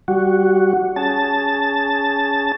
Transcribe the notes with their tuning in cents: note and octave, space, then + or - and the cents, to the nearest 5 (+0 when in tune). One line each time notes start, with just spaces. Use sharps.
G3 -20 F#4 +0
C#4 +20 G#4 +0 A5 +0